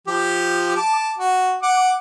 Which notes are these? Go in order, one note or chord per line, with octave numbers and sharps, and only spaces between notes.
F3 G4
A5 D6
F#4
F#5 D6